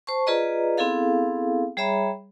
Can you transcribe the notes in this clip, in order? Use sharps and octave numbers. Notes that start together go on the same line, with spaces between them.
C5 A5 C#6
F4 G#4 B4 D5 D#5 A#5
B3 C4 E4 G#4 A4 F5
G3 G#4 C#5 E5 A#5 B5